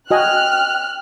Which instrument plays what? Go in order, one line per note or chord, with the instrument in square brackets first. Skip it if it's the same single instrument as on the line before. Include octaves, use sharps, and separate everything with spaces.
[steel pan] F#4 D#5 G#5 [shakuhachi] G5 [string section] F6 F#6